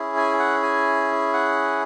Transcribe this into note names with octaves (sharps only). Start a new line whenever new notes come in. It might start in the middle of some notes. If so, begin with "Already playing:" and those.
Already playing: C#4 E4 G#4
G#5
F#5
G#5
F#5